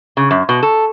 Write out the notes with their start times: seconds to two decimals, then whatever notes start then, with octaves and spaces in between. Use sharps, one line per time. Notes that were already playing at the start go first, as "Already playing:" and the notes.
0.17 C#3
0.31 F#2
0.49 B2
0.63 A4